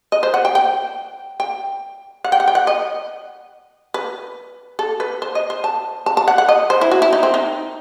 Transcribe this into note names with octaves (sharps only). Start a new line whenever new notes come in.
D#5
C5
F#5
G5
G5
G5
F#5
G5
F#5
G5
F#5
D#5
B4
A4
B4
C5
D#5
C5
A5
A5
A5
F#5
F#5
D#5
C5
E4
F#4
E4
D#4
C4
D#4